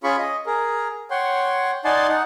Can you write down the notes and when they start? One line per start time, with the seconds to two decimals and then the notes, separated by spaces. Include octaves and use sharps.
0.04 C#4 F4 G#4 B5 C#6
0.19 D#5
0.46 G#4 A#4
1.11 C#5 F#5 G5 C6
1.85 D#4 D5 F#5 G#5 A5 C6
2.08 D#4 F#5